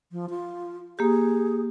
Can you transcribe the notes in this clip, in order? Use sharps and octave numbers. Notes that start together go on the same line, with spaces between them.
F3
F4
A#3 G4 G#4